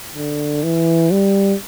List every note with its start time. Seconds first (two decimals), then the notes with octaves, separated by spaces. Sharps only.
0.16 D3
0.64 E3
1.11 G3